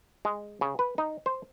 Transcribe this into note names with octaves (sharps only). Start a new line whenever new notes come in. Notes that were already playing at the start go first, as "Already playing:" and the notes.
G#3
C#3
B4
D#4
C5